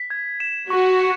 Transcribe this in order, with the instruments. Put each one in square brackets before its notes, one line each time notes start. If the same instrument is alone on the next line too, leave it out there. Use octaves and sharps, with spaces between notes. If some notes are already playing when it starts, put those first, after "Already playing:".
Already playing: [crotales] B6
G#6
E7
[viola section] F#4 [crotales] C#6
[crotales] C#7